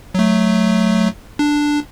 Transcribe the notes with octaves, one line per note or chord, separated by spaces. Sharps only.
F#3 A3
D4